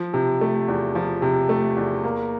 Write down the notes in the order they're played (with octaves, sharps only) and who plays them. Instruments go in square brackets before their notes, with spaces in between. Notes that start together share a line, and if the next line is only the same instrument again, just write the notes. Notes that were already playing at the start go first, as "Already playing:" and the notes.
Already playing: [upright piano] F3
C3
A3
E2
F3
C3
A3
E2
A#3